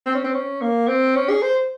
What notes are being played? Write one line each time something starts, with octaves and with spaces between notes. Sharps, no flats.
C4
C#4
C4
C#4
A#3
C4
C#4
G#4
C5